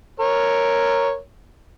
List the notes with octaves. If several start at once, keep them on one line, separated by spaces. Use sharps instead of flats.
A#4 C#5